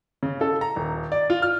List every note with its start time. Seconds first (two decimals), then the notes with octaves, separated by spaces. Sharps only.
0.23 C#3
0.41 A4
0.61 A#5
0.76 D#1
1.12 D5
1.30 F4
1.42 F6